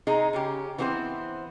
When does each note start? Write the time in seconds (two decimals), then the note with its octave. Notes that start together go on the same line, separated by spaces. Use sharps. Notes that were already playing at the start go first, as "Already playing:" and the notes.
0.07 C3 D#4 G#4 D#5 A#5
0.33 C#3 C#4 G4
0.78 E3 B3 C4 G4 C5